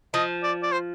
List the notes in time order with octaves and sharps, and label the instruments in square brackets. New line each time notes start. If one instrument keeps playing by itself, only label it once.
[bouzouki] F3 [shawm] D#5
[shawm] D5
D5
C5